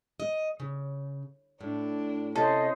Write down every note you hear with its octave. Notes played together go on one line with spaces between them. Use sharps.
D#5
C#3
A2 D4
C3 C#4 A4 C5 D#5